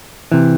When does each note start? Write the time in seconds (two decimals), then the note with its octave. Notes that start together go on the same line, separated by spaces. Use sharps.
0.32 C3 E3